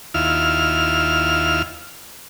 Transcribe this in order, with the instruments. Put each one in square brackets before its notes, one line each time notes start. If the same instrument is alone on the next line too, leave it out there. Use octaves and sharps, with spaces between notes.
[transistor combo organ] D#2 E4 F4 F6